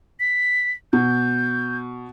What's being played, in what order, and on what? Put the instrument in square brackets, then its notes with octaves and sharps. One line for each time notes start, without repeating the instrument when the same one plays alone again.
[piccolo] B6
[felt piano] B2 [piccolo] G6